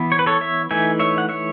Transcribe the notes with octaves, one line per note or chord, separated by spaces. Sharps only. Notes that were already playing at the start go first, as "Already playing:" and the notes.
Already playing: E3 B3 E4
C#5
B4
A4 C#5
C#5 E5
E3 A3 D#4 E5 G#5
C#5 E5
F#5
C#5 E5